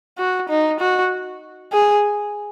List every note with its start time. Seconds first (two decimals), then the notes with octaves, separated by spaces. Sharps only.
0.18 F#4
0.49 D#4
0.80 F#4
1.73 G#4